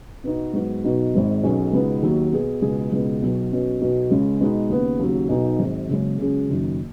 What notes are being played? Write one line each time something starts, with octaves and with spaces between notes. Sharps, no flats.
B2 B3 D#4 F#4
G#2 F#3 B3 F#4
B1 B2 B3 D#4 F#4
G#1 G#2 D#3
B1 B2 F#3 C#4 G#4
C#2 B2 B3 D#4
D#2 D#3 F#3
B2 B3 G#4
C#2 B2 B3 G#4
C#2 B2 B3
B1 B2 F#3
B2 F#3 C#4
B1 B2 F#3
C#2 C#3 G#3 C#4
B2 G#3 B3 D#4
D#2 C#3 B3
D#2 C#3 F#3
B1 B2 F#3 D#4 F#4
G#1 G#2 F#3
F#1 F#2 C#3 G#3 C#4
C#2 C#3 F#3 C#4 G#4
F#1 F#2 D#3